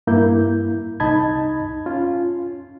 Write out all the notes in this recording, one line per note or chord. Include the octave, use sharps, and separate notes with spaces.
G2 A#3 E4 G6
C2 D#4 D#5 A5 B5 G#6
C#4 F4